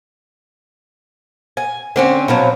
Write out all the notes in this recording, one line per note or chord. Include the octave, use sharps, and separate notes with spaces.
G#5
D3 C4 C#4
B2 F3 F#3